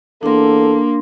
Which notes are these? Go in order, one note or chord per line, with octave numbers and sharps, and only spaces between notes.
E2 A#3 D4 A4 C6